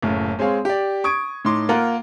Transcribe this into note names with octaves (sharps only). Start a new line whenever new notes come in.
F#1 A2 C#3
G#3 C4 G#4 C#5 F5
G4 D5
C#6 D#6 G#6 D7
A2 D#4 C6 D6
A#3 F4 A#4 F#5